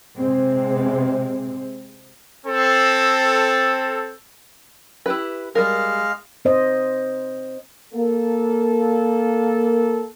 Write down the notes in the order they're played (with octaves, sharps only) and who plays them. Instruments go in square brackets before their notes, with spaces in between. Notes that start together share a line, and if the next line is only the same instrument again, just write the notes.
[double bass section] C3 G#3 C4
[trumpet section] C4 A4
[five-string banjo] E4 G4 B4
[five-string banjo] G3 A#4 [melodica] G#3 F5
[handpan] C4 C5 D#5
[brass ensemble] A#3 A4